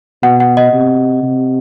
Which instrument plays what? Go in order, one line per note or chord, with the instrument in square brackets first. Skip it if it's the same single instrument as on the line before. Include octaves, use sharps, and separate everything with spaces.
[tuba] B2 [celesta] F#5
[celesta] F#5
D#5
[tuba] C3
C3